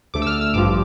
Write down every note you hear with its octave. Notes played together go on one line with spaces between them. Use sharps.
D2 D3 A3 D6
E6
F6
E6
A1 G2 F3 D6